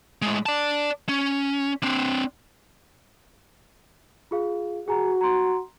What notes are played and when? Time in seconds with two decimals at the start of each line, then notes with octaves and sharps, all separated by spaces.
0.22 A2 G#3
0.46 D5 A5
1.09 C#4
1.83 C4 D4
4.31 F4 G#4 F5
4.88 F#4 G#4 G#5 A#5
5.21 A#5 C6